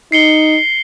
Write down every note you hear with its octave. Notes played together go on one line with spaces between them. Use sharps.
D#4 C7 C#7 G7